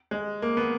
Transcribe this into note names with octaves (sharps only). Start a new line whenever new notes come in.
G#3
A#3
B3